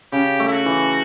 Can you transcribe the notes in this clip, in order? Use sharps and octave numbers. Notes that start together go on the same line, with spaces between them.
C#3 G4
A3
E4
F#4
E3